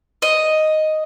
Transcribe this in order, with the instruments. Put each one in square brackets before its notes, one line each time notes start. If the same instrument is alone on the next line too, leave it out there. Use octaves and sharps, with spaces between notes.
[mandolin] D#5